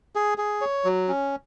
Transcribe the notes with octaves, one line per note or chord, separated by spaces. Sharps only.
G#4
G#4
C#5
F#3
C#4